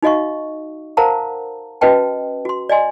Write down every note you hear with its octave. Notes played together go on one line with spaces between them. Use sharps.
D#4 F#4 D#5 F5 C#6
A#4 C5 F5 F#5 A5 A#5
C#4 F#4 B4 D#5 G5 A5
F#4 C6
D5 D#5 G#5 C6